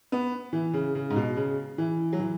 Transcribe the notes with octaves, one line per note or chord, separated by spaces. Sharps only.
B3
E3
C#3
C#3
G#2
B2
C#3
E3
F#3
E3